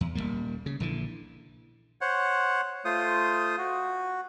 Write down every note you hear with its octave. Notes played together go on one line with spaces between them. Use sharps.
E2
D#1 E2 G3 A#3
C#3
A#1 D3 E3
C5 C#5 F#5
A3 F4 C5 D#6
F#4